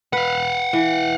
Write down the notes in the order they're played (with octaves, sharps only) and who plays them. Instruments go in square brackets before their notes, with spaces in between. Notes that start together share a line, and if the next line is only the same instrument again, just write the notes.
[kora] B4 [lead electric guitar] F5 F#5
[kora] E3